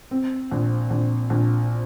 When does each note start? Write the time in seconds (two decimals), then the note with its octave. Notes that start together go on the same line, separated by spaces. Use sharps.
0.11 C4
0.51 A#1
0.90 A#1
1.30 A#1